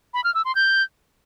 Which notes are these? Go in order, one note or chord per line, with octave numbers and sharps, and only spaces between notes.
B5
F6
E6
C6
G6